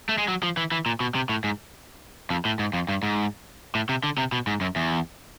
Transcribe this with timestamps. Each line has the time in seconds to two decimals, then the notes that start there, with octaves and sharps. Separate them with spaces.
0.09 A3
0.18 G#3
0.28 F#3
0.43 F3
0.57 E3
0.72 E3
0.86 A#2
1.00 B2
1.15 C3
1.29 A2
1.44 G#2
2.30 F2
2.45 A2
2.59 G#2
2.73 F2
2.89 G2
3.03 G#2
3.75 A2
3.89 C3
4.04 D3
4.18 C3
4.32 B2
4.47 G#2
4.61 F#2
4.76 E2